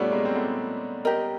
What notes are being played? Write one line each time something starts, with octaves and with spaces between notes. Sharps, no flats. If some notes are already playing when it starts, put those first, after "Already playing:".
Already playing: G3 A3 B3 C#4 D4 F4
G#3 A#3
C4
A3 B3
G4 A#4 D#5